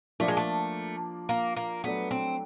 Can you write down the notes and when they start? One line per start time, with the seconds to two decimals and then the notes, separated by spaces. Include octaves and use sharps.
0.20 F3 A3 A#3 D4 F4
0.28 G#3
0.37 A3
1.29 A#3
1.57 A#3
1.84 F#3 A3 B3 D4
2.11 C4